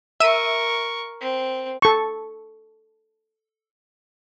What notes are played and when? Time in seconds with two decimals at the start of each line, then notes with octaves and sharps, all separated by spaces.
0.20 A#4 E5 C#6 E6 D#7
1.21 C4
1.82 A4 C#6